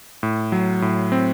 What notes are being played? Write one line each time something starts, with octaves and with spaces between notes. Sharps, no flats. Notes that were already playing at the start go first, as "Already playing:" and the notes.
A2
F#3
A2
C4